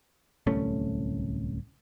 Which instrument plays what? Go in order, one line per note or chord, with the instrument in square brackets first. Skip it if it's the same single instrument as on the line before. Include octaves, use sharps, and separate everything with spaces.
[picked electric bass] D1 C2 A3 C#4